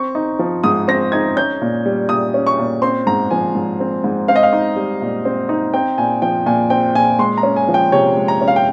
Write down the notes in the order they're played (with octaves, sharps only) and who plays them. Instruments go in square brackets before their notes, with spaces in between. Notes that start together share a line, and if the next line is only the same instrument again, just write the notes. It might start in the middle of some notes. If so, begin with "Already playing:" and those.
Already playing: [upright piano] C4 C#6
D#4
F3
G#2 D#6
C4 A#6
D#4 G#6
C#4 G6
A#2
G3
A#2 D#6
C#4
C#6
A#2
C4 C6
G#2 A#5
F3 G#5
G#2
C4
G#2
C4 F5
D#5
F5
D#4
G3
A#2
C4
D#4
C4 G5
A#2 G#5
F3 G5
A#2 G#5
C4 G5
A#2 G#5
G#3 C6
A#5
C#4
G#5
F3
G5
C3 C#5
G#3
A#5
C#4
F5
G5